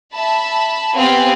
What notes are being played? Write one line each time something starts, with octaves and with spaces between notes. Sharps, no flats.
E5 A5 B5
B3 C4 G4 F5 F#5 G#5